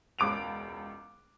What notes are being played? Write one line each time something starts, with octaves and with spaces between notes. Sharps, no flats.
E1 C#2 D6 D7 F7